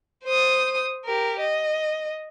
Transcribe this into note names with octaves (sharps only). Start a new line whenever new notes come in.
C5 D#6
G4 A#4
D#5